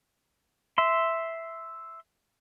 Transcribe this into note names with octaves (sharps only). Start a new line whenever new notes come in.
E5 C6